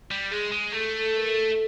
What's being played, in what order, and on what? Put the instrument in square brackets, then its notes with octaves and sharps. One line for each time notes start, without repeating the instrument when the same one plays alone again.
[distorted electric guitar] G3
[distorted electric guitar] G#3 [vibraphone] G#4
[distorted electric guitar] G#3
[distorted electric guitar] A3 [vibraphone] A4
[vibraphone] A4
A#4
A4